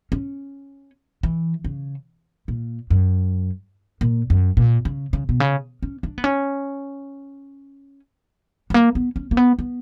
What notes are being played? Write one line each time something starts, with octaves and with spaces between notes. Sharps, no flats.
C#4
E3
C#3
A#2
F#2
A#2
F#2
A#2
C#3
C#3
B2
C#3
C#4
D4
B3
C#4
G3
A#3
B3
C#4
A#3
B3
B3